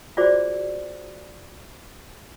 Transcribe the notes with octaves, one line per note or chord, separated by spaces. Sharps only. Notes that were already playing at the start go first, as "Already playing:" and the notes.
F4 F#4 G#4 C5 D5 D6